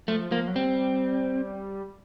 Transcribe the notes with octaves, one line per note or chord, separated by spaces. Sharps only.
F3 A3
F3 A#3
F#3
G3 C4